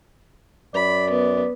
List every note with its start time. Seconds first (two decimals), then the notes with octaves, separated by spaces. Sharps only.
0.74 F#2 D5 B5
1.10 B3